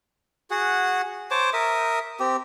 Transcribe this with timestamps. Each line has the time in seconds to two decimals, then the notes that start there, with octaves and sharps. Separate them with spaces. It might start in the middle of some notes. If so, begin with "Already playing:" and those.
0.51 F#4 G#4 F#5
1.31 C5 C#5 A5 D6
1.53 A#4 E5 D#6
2.20 C4 G4